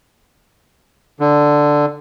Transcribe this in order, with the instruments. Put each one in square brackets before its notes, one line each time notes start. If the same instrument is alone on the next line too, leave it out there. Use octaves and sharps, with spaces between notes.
[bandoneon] D3